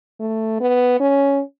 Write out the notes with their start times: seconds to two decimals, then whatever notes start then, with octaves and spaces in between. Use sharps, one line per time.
0.20 A3
0.61 B3
1.00 C#4